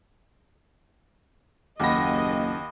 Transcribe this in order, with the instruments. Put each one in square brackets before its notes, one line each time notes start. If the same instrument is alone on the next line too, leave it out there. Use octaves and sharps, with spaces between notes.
[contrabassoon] F#1 [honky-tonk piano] D#2 F#5 A#6 [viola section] D#5 [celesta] B5 D6